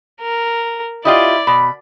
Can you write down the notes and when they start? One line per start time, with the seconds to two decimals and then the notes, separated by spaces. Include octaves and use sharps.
0.21 A#4
1.05 E4 F4 G4 D5 D#5
1.47 B2 B5